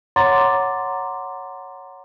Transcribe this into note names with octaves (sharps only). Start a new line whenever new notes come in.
C#5 F#5 A#5 C6 D6 A6